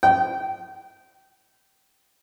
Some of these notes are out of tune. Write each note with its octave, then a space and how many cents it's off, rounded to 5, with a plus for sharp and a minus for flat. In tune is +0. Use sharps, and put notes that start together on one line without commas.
G5 -20